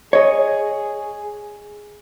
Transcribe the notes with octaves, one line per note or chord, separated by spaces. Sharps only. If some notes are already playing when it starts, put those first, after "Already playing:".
G#4 C#5 D#5